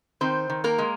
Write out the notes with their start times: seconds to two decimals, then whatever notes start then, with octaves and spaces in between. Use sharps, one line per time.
0.21 D#3 C4 C5
0.50 D#3
0.64 A#3 A#4
0.78 G#3